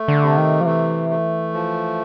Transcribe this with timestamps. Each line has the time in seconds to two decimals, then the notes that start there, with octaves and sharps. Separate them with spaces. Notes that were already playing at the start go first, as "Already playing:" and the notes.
Already playing: A3
0.08 D3
0.23 C3
0.37 D#3
0.60 F3
0.66 E3 A3
1.10 A3
1.54 F3